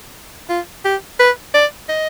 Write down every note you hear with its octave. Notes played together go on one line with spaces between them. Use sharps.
F4
G4
B4
D5
D#5